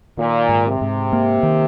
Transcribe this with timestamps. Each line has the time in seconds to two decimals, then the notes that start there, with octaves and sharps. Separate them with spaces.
0.17 A#2 D#3
0.49 G#2
0.65 C3
0.81 G#2
1.13 A#3
1.43 D#3